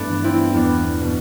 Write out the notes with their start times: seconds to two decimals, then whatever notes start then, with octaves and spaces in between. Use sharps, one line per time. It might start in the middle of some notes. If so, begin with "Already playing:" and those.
Already playing: G2 A3 B3 D4
0.09 E3
0.24 C4 E4
0.53 E2 B3 D4
1.01 B2